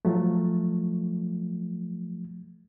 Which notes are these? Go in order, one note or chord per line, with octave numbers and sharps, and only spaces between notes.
F3 F#3 A3